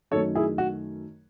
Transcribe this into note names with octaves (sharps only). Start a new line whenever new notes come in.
F#2 D#3 A3 A4 C#5
E4 G#4
F#4